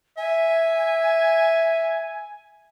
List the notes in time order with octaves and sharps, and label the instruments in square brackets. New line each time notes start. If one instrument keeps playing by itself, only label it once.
[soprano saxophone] E5 [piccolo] G#5